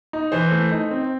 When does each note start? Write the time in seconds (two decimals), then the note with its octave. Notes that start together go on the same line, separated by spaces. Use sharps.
0.13 D#4
0.32 E3 C5
0.51 A3
0.71 D#4
0.91 C4